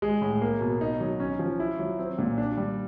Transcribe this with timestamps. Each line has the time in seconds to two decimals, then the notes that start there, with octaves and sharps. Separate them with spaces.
0.02 G#3
0.21 A2
0.42 A#3
0.61 B2
0.81 D#4
1.00 F#3
1.20 C#4
1.39 F3
1.60 E4
1.79 F#3
1.99 C4
2.18 A#2
2.38 D4
2.57 G3